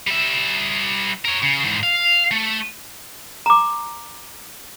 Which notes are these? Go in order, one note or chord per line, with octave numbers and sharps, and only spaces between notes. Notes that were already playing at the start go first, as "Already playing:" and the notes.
G3 E5
A#4 C#5
C#3
G#2 E3
F5
A3
A#5 D6